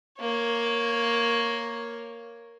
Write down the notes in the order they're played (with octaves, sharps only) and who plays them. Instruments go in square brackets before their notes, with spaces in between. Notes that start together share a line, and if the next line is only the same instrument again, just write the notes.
[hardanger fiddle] A#3 C#5